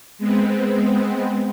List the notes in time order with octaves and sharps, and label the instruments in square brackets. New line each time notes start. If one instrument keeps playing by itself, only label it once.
[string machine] G#3 B3 C4